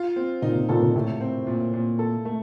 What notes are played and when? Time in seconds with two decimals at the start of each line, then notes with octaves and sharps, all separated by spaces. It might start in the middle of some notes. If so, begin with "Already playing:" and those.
Already playing: F4
0.16 C4
0.42 A#2 D#4
0.55 C3
0.69 A#2 A4
0.82 A#2
0.95 A2 C3
1.21 C4
1.47 A#2
1.74 A#2
1.99 A4
2.25 A3